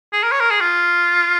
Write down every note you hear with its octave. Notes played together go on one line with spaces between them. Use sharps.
G#4
A#4
C#5
A#4
G#4
F4